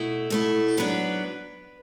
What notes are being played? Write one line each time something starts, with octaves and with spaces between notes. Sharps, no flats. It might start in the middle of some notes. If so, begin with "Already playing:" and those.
Already playing: B2 A3 E4
B2 A3 E4
G#2 F#3 B3 D4 B4